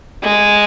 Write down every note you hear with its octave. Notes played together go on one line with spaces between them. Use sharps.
G#3